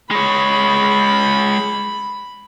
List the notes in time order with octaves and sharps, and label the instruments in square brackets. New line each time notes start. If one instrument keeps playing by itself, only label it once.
[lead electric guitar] G#3 C#5 [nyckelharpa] B5